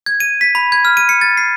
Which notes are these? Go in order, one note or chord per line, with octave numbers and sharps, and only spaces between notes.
G#6
D#7
B6
B5
G#6
F6
D#7
C#7
A6
C7